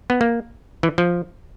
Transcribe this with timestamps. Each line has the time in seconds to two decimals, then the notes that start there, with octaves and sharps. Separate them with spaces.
0.10 B3
0.21 A#3
0.83 E3
0.98 F3